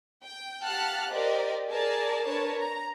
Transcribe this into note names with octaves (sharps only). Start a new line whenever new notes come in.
G5
G4 F5 F#5 A5 F6 F#6
G4 A#4 C5 D5 D#5
G#4 A#4 D5 A5
D4 A#4 B4 C#5 A5
A#5